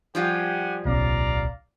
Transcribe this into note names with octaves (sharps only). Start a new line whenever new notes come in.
F3 G3 F4 G4 F#5 G#5
D1 B1 C#4 D5 F5 A#5